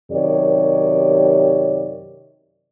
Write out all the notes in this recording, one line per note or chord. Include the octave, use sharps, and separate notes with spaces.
F#2 C3 D#3 G4 C#5 D5